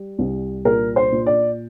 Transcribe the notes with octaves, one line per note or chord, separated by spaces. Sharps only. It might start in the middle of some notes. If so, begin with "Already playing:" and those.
Already playing: G3
C2
A#2 A#4
C5
A#2
D5